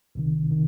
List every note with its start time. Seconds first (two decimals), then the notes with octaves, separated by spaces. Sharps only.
0.15 C2 C3 D#3
0.50 C3 D#3